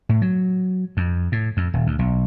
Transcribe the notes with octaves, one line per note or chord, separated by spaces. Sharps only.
A2
F#3
F2
A2
F2
D#1
D2
B1